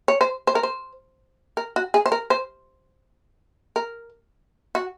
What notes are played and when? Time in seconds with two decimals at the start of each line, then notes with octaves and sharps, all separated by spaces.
0.08 C#5
0.21 C5
0.47 C5
0.55 A#4
0.63 C5
1.57 A#4
1.76 F#4
1.94 G#4
2.06 C5
2.12 A#4
2.30 C5
3.76 A#4
4.75 F#4